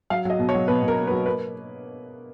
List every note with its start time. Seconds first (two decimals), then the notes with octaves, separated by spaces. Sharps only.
0.10 F#3 F5
0.25 F#3 D#5
0.39 B2
0.49 C#5
0.55 F#3
0.68 B2 B4
0.82 B2
0.88 A#4
0.98 A#3
1.07 B4
1.11 F#3
1.26 A#3 B4